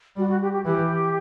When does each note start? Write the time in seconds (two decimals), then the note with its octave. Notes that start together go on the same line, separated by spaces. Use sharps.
0.16 G3 F#4
0.28 F#4
0.41 G4
0.52 G4
0.65 E3 G4